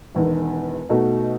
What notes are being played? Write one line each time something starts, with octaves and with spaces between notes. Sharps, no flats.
E1 E2 D#3
B2 A3 D#4 F#4